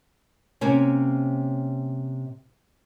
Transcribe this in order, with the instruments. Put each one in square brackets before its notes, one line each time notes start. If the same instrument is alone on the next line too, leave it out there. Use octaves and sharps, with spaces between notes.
[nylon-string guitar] C3 A#3 C#4